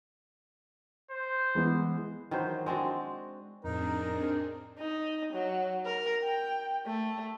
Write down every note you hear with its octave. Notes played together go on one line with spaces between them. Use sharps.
C5
E3 G#3 B3
D#3 E3 F#3 C5
G#3 C4 D4 F#4
F2 A2 C4 D4 D#4 G#4 A#4
D#4
F#3
A#4
G5
A3